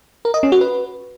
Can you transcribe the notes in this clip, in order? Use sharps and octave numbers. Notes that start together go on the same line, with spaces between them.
A#4
D#5
C#4
F#4
B4